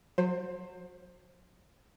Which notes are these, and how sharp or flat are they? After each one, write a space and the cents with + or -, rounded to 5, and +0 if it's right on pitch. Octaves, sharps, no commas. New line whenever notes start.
F#3 -30 C5 +15